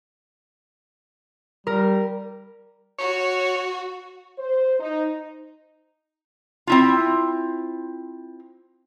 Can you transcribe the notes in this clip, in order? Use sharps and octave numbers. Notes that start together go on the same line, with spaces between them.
G3 A#4
F#4 C#5
C5
D#4
C4 E4 F4